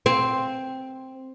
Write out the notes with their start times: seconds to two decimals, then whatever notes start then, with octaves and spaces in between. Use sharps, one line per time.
0.06 C4